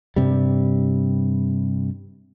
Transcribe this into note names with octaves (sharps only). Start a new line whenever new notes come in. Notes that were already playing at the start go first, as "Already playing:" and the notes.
G2 C3 G3